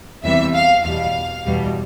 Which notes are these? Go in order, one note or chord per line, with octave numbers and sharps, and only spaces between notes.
E2 C3 E3 G3 E5
F5
E2 B2 G3 F5
E2 B2 G3